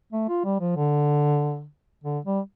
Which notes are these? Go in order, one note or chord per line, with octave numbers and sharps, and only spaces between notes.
A3
F4
G3
F3
D3
D3
G3